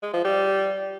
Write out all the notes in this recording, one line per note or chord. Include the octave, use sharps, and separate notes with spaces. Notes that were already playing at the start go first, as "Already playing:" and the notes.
G#3
F3
G3